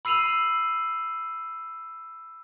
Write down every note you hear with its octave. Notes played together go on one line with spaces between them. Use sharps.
B5 E6 C7 D#7 F7 F#7